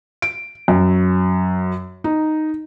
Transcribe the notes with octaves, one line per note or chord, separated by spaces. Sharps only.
D7
F#2
D#4